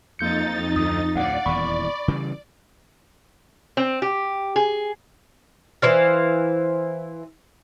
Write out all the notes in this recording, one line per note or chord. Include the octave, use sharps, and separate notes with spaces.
F2 A#3 D#4 G6 A6 C#7
D2 D#6
D2 A2 D5 F5 F#5
D#1 E2 E3 B5 C#6
C#3 E3 G3
C4
G4
G#4
E3 C5 F5